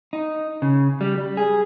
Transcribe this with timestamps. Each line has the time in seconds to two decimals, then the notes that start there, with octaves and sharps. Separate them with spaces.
0.13 D#4
0.62 C#3
1.01 G3
1.18 G3
1.37 G#4